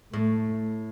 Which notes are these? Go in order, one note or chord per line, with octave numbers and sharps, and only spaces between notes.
A2 A3